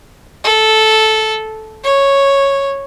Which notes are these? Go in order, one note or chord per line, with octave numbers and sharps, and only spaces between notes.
A4
C#5